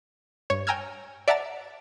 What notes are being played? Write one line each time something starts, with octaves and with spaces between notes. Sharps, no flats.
G2 C#5
G5 G#5 A#5 E6 F6 G#6
D5 E5 F#5 A5 A#5 A6